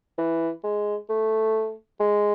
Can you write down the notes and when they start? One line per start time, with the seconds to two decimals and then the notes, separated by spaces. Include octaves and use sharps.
0.18 E3
0.64 G#3
1.09 A3
2.00 G#3